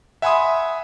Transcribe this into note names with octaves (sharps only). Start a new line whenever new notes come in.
E5 F#5 G#5 B5 C6 D#6